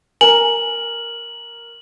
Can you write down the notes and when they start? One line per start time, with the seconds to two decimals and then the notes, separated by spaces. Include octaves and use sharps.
0.21 A#4 G#5 A#5 F#7